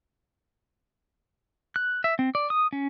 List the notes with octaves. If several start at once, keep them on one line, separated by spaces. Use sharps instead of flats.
F#6
E5
C4
D5
D#6
C#4